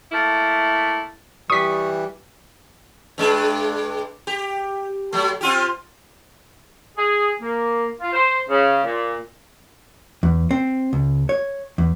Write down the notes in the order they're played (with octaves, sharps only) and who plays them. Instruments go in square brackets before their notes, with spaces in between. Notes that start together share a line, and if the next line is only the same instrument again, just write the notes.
[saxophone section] A3 A#3 E4
[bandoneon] E3 [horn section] G3 [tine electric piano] C#6 [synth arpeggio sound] D#6 B6
[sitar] G2 G#3 D4
G4
F#3 A3
C4 F4 G4
[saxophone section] G#4
A#3
F4
C5
C#3
A#2
[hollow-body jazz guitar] E2
C4
C#2
C#5
E2